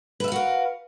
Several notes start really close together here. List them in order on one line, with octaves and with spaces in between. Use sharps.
B4 E5 F5 F#4 A#4